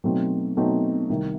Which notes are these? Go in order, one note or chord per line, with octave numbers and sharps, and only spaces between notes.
B2 F#3 A3 C4 D#4
B2 F#3 A3 C4 D#4
C2 C3 D#3